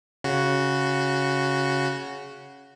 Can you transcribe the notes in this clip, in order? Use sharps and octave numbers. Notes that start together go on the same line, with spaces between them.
C#3 F#4